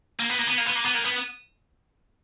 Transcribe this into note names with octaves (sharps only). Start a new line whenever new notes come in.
A#3
B3
A#3
B3
A#3
B3
A#3
B3
A#3
B3